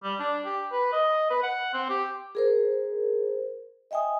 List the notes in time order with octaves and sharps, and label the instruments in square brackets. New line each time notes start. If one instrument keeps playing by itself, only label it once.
[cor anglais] G3
D4
G4
B4
D#5
B4
F#5
C4
G4
[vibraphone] G#4 A#4 C5
D#5 E5 G5 G#5 D#6